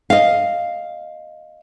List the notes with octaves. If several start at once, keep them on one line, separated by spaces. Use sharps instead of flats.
D#5 F5